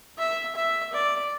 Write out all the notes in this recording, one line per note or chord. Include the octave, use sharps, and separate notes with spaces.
E5
E5
D5